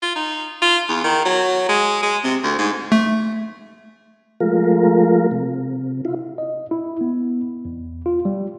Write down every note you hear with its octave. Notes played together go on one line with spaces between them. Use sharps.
F4
D#4
F4
E2
D#3
F#3
G#3
G#3
C3
D2
G#2
A3
F3 G#3 A3 F4 A#4
C3
E4 F4
D#5
E4
B3
E2
F4
G3